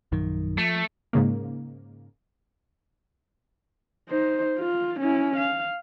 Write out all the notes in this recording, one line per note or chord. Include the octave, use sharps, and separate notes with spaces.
A#1 F#2 D#3
F3 A3
G#2 C#3 A#3
D#4 C5
F4
C#4 E4
F5